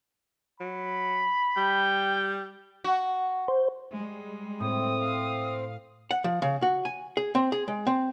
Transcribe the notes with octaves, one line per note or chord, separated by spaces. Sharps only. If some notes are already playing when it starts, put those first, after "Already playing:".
F#3 B5
G3 G5
F#4
C5
G3 G#3
A2 C4 D#6
F5
F#5
F3
C#3
F#4
G#5
G#4
C4
G#4
G#3
C4